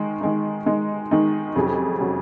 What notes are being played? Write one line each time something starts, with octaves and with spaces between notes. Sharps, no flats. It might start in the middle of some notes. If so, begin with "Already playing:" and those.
Already playing: D#3 G#3 D#4
D#3 G#3 D#4
D#3 G#3 D#4
D#3 G#3 D#4
F2 C3 F#3 C#4 G#4
C3 F#3 C#4 G#4